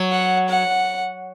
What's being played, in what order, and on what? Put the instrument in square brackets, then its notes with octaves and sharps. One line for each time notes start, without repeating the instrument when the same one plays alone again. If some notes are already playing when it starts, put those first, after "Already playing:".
Already playing: [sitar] F#3
[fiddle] F#5
F#5